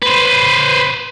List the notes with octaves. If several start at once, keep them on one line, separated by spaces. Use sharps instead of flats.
B4 C5